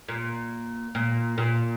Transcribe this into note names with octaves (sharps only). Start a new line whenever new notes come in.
A#2
A#2
A#2